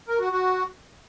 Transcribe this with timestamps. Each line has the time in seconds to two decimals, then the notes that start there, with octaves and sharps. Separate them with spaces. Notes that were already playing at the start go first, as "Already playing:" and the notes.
0.08 A#4
0.19 F#4
0.31 F#4